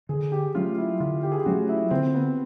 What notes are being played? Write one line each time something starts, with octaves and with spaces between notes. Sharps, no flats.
D3 G#4
G4
F#3 A3 C#4 F4
E4
D3 F4
G4
G#4
G4
F#3 A3 C#4 F#4
E4
D3 C4
B3